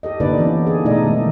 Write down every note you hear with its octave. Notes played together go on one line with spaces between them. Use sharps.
G4 A4 D#5
D3 A#3 D4 D#4 B4 D5
E3 B3 C#4
G#4
B2 A3 D#4 A4 D5 D#5
D#3 G#3